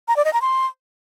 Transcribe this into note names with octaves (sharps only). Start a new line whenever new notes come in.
A#5
D5
D#5
A#5
C6